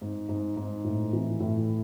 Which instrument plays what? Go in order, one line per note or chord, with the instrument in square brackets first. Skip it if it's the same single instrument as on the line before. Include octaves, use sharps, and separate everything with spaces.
[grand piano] G#2
G#2
G#2
A2
E3
A2